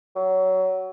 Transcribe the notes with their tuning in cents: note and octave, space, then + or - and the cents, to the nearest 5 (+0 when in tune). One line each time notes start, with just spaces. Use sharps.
F#3 +20